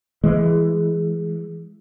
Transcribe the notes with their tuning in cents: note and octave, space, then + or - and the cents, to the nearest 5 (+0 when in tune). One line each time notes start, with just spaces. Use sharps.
E3 +10 G#3 +0